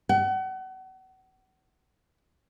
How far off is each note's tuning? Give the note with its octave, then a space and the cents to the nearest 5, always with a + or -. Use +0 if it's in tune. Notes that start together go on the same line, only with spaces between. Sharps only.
F#5 +35